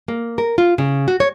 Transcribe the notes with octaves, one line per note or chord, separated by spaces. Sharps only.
A#3
A#4
F4
C#3
F#4
C#5